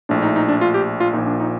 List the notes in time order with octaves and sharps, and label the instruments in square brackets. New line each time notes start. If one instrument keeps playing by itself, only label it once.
[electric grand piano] A#1 A2 D4
D#4
D#4
D4
F4
G4
F4
A#2 D#4
A#1
D4
D#4